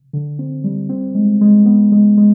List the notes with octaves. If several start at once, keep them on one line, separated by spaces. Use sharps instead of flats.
D3
C4
G3
C4
G#3
G#3
B3
G#3
G#3